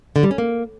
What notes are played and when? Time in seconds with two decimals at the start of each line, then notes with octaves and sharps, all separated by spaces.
0.16 D3
0.23 G3
0.31 C#4
0.38 A#3